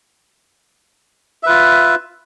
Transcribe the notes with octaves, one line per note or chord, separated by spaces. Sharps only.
F4 B4 E5